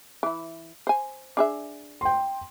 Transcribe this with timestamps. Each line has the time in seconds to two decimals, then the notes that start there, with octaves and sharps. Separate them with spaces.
0.23 E3 E4
0.87 C5 G#5
1.37 D4 G#4 E5
2.01 G5 C6